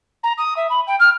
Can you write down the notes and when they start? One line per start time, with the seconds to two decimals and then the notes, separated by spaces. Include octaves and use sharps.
0.23 A#5
0.37 D#6
0.56 E5
0.70 B5
0.87 G5
0.99 F6